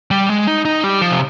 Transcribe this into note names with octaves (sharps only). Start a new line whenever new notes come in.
G3
G#3
D#4
D#4
G3
F3
C3